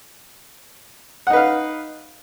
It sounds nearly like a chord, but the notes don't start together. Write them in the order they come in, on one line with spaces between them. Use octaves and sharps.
F#5 D#4 B4 F5